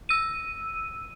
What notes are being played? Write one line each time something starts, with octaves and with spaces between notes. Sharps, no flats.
E6 D#7